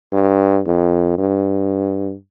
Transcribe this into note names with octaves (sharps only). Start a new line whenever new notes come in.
G2
F2
G2